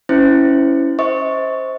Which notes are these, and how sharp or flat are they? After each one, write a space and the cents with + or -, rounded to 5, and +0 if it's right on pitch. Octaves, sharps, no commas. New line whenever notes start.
C#4 +0 E4 -10 C5 -30
C5 +0 D#5 +45 C#6 +0